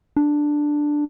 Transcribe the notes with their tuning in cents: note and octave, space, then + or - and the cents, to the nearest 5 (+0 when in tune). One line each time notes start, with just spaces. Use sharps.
D4 +5